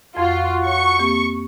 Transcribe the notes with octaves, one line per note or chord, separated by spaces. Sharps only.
F2 F4 F#4
C#5 C#6
A#3 C4 G4